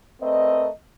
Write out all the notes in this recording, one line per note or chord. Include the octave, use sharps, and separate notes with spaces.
A3 C4 A#4 B4 D5 D#5